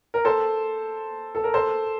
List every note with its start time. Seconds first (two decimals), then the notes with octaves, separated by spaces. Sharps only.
0.14 A#4
0.25 A4 C5
1.35 A4
1.44 A#4
1.54 A4 C5